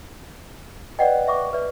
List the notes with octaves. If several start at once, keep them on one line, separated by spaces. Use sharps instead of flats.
B4 D5 D#5 F#5 G5
E5 C#6 D6
B4 D5 E5